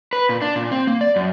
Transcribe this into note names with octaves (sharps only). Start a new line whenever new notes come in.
B4
A#2
D4
A#2
C4
A#3
D5
F#2